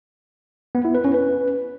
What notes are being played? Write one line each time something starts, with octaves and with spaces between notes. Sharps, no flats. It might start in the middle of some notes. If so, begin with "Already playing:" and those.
B3
E4
B4
C#4
B4